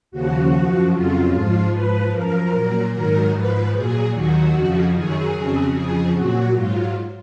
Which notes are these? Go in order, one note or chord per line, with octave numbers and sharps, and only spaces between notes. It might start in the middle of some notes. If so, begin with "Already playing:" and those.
D#2 C#3 F3 F#4
F#2 F3
F2 C#3 F#3 F4
G#2 F3 F4
G#2 F3 B4
F#2 F3 A#4
A#2 F#3
G#2 D#3 F#3 A#4
G#2 F3 B4
A#2 F#3 G#4
D#2 D#3 F#3 F#4
F2 C#3 F3
F#2 D#3 F#3 G#4
F2 C#3 F#3
F2 C#3 F3 G#4
A#2 F#3 F#4
G#2 F#3 F4